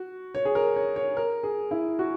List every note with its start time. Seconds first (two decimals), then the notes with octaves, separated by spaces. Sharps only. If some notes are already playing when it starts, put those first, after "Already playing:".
Already playing: F#4
0.35 C#5
0.45 G#4
0.55 A#4
0.76 C#5
0.96 C#5
1.17 A#4
1.43 G#4
1.71 E4
1.99 F#4